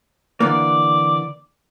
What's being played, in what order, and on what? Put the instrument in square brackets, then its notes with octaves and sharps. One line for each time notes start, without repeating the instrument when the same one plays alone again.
[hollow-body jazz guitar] D3 E3 A#3 [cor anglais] D5